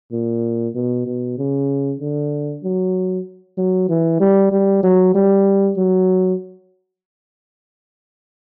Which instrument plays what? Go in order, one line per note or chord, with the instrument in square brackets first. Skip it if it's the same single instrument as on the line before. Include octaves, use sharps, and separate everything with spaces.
[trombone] A#2
B2
B2
C#3
D3
F#3
F#3
E3
G3
G3
F#3
G3
F#3